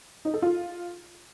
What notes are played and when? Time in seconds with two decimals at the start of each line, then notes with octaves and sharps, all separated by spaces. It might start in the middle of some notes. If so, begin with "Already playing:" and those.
0.25 D#4
0.34 A4
0.42 F4